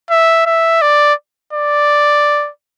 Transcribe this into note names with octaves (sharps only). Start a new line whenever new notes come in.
E5
E5
D5
D5